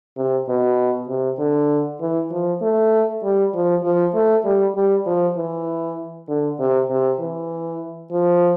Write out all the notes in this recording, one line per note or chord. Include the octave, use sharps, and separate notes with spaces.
C3
B2
C3
D3
E3
F3
A3
G3
F3
F3
A3
G3
G3
F3
E3
D3
C3
C3
E3
F3